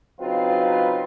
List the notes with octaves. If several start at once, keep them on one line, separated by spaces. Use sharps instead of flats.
C#3 F#3 C4 D#4 F4 B4